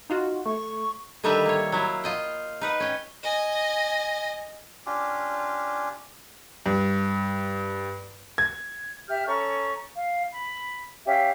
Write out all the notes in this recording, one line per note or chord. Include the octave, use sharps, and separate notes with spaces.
D#4 F4 F#4
A3 C#6
D3 D#3 G3 B4 E5 A#5
A#3 C#5
F#3 E4 F4
F4 D#5 G5
D#4 B4 F#5
C#4 G5
D#5 G#5
C#4 D4 F4 G4
G2
G#6
G4 E5 F6 G6
C#4 A4 A#5 C#6
F5
B5
C#4 G4 E5 F5